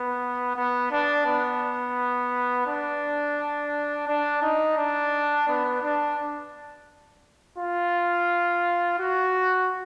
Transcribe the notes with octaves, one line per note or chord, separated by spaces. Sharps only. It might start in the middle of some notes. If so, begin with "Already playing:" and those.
Already playing: B3
B3
D4
B3
D4
D4
D#4
D4
B3
D4
F4
F#4